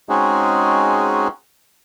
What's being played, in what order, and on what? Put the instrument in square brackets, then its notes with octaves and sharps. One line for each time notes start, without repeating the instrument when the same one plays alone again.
[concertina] G#3 C4 C#4 D#4 F#4 G#4